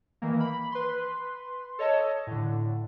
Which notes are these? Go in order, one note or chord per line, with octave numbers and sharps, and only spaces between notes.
D#3 E3 A#3
B5
B4 C6
A4 C#5 D#5 A5
A2 D3